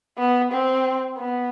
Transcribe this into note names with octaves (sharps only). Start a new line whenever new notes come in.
B3
C4
B3